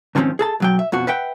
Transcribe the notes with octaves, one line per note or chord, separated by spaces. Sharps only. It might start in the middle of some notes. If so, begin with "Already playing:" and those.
G#2 D3 D#3 F3 C4 C#4
G#4 A4 A5
B1 F#3 G5
E5
F2 B2 F#4
B4 E5 F#5 G5